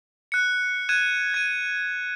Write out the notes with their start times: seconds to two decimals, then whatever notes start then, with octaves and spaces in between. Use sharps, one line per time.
0.32 F#6 C#7
0.89 F#6 G#6 D#7 E7
1.34 G#6 D#7